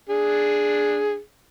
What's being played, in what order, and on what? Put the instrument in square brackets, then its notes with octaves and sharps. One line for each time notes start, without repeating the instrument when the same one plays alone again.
[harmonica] D4 G#4